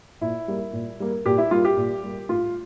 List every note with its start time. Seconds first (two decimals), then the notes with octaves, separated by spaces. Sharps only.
0.21 A#2 E4
0.48 G3 A#3
0.73 A#2
1.00 G3 A#3
1.26 A#2 G4
1.38 E4
1.51 G3 A#3 F4
1.65 G4
1.77 A#2
2.03 G3 A#3
2.29 A2 F4